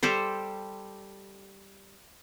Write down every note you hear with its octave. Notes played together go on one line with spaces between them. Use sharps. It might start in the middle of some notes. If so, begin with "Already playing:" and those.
G3 G4 A4 C5